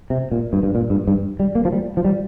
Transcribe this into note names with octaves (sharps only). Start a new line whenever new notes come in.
C3
A#2
G2
G2
A#2
G2
G2
G3
A#3
F3
G3
F3
G3